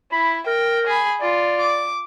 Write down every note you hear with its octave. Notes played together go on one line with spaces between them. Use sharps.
E4 B5
A#4 G5
G#4 B5
F4 D5
D6